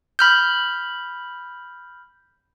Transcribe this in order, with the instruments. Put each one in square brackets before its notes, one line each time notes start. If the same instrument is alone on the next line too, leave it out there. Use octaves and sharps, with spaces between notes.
[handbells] B5 F6 G6